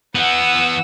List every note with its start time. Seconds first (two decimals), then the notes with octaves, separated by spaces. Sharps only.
0.15 E3 B3 F#5 E6